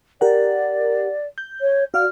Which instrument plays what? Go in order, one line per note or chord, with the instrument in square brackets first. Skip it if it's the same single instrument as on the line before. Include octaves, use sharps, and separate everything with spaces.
[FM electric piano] G4 A#4 F#5 [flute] D5
[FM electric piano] G6
[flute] C#5
[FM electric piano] F#4 D5 F5 [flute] F6